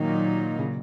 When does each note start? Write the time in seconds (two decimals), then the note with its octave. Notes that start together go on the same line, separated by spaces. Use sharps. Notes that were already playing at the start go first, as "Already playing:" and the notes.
Already playing: A#2 D#3 F#3 A#3 D#4
0.59 C#3